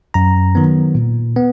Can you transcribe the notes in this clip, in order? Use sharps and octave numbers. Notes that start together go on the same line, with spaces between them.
F#2 A#5
D#3 F#3 B3
A#2
B3